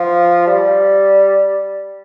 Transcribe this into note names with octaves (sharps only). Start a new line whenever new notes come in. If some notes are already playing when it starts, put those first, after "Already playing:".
Already playing: F3
G3